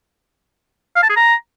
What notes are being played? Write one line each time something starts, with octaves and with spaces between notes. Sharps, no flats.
F5
A5
G#4
A#5